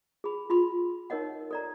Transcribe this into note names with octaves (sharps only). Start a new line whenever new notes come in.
G#4 B5
F4 B5 C6
D#4 A#4 C#5 D#5 F#5
A4 D5 A#5